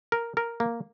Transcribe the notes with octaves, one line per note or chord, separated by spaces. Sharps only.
A#4
A#4
A#3